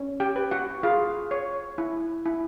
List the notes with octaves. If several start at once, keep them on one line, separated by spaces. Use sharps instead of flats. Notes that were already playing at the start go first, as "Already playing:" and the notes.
Already playing: C#4
G4 G5
B4
F#4 F#5
F4 G#4 F5
C#5
E4
E4